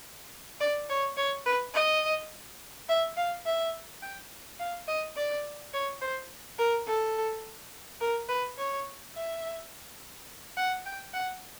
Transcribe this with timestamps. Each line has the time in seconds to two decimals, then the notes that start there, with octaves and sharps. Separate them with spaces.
0.60 D5
0.90 C#5
1.17 C#5
1.46 B4
1.75 D#5
2.89 E5
3.17 F5
3.46 E5
4.02 G5
4.59 F5
4.88 D#5
5.17 D5
5.74 C#5
6.01 C5
6.59 A#4
6.87 A4
8.01 A#4
8.29 B4
8.58 C#5
9.15 E5
10.57 F#5
10.86 G5
11.14 F#5